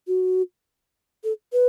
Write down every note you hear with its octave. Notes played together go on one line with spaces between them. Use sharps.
F#4
A4
B4